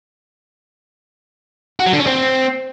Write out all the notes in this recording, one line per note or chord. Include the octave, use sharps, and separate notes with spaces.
F#4
F#3
D3
C#4
C4